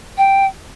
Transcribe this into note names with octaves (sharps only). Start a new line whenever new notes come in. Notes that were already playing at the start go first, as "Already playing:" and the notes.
G5